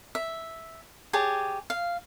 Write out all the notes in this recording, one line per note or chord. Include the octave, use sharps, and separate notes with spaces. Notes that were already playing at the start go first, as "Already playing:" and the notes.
E5
G4 G#4 C#5 A5
F5